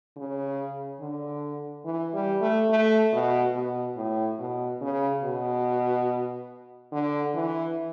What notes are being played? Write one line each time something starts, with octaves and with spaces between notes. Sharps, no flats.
C#3
D3
E3
G3
A3
A3
B2
B2
A2
B2
C#3
B2
D3
E3